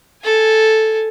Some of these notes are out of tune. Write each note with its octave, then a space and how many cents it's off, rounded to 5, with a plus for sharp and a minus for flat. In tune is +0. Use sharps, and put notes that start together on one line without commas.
A4 +0 G#5 +0